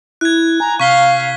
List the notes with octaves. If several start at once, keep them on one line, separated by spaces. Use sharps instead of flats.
E4 F#6 G#6
G#5 A#5
C3 F5 C#6 B6 G7